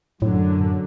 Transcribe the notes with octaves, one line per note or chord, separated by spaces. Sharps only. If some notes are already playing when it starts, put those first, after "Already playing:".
F#2 A2 D3 F#3